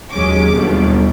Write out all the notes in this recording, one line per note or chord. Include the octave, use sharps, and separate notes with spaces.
D#2 F#3 G#3 C#4 D6
G1 D#2 B2 G3